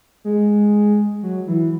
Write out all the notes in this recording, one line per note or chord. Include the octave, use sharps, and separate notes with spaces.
G#3
F#3
E3